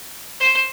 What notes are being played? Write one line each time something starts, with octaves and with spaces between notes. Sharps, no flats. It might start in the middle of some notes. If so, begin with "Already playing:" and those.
C5